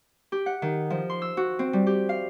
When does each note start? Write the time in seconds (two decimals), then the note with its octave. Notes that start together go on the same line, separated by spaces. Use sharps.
0.32 G4
0.46 F#5
0.62 D#3
0.90 F3
1.10 C6
1.22 E6
1.37 F#4
1.59 C4
1.73 G3
1.87 G4
2.09 F5